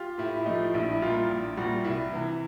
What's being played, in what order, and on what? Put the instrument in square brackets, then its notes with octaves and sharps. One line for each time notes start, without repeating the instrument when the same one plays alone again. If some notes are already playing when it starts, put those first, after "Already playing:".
Already playing: [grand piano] F4 G4
[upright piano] A2 [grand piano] E4
[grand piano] E4
[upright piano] F3 A3 [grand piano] D#4
[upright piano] A#1 [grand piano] E4
[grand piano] E4
[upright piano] A#2 G3 [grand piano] F4
[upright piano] A#1
[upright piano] A#2 G3 [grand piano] F#4
[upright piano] C2 [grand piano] E4
[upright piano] C3 E3